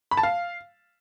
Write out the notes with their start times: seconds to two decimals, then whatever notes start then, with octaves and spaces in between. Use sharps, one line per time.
0.11 B5
0.17 A5
0.23 F5